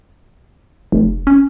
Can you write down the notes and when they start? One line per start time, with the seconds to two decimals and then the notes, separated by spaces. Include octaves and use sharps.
0.92 F1
1.27 C#4